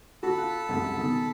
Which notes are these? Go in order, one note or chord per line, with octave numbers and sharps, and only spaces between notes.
F#4 A4 A5 B5
F4 F#6
C2 F#2 G#3
B2 D#3 G#4